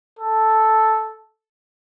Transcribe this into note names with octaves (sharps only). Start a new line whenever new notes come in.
A4